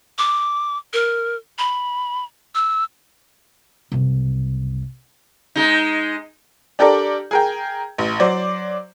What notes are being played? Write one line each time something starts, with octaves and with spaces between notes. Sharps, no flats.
D6
A#4
B5
E6
F#1 C2
G#3 D#4
D4 G4 A4 A#4 D5
G#4 A#4 G5
A1
F#3 C5 D5